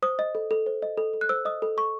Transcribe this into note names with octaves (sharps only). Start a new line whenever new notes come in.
C5 D#6
D#5
A4
A4
C5
D#5
A4
A4
F#6
C5 E6
D#5 D#6
A4
A4 C#6